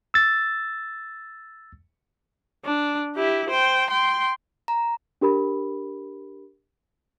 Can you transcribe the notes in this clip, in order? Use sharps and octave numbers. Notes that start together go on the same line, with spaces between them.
E6 A6
D4
E4 G4
C5 G5
G5 C6
A#5
D4 G4 A#4 B5